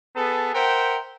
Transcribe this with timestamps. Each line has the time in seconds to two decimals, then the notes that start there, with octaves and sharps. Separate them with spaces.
0.16 B3 G#4 A4 B4 A5
0.55 A#4 C5 E5 F#5 G5